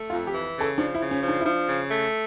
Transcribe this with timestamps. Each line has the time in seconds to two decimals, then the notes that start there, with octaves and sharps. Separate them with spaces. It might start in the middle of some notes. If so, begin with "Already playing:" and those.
Already playing: A3
0.10 F2 F4
0.27 G4
0.33 E3
0.55 C#3
0.61 A4
0.77 F3 D4
0.95 E4
1.00 C#3
1.11 C#4
1.22 F3
1.28 D4
1.41 E4
1.45 F3 D4
1.67 C#3
1.90 A3